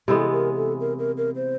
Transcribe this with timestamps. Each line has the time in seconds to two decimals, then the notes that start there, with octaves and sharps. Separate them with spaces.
0.08 C3 E3 G#3 B3 A4
0.32 A#4
0.56 A4
0.80 A#4
0.99 A#4
1.18 A#4
1.36 C5